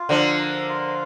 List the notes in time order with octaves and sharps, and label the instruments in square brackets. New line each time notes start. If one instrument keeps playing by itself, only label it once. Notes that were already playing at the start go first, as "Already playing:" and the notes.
Already playing: [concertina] F4
[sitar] D3 F3 [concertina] A#4
[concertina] A#4
F4